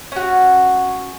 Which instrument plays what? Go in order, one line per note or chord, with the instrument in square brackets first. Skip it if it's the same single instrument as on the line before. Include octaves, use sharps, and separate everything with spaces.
[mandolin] C#4 F#4